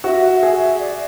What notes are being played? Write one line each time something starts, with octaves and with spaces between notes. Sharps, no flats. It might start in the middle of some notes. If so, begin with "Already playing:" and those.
F#4 E5
E5
G#4
E5
D5